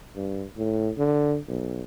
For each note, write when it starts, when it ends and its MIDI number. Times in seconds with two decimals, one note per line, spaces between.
0.16 0.44 43
0.57 0.91 45
0.97 1.38 50
1.48 1.82 35